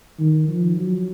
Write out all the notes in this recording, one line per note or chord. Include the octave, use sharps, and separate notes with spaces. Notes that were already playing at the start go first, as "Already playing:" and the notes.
D#3
F3
F#3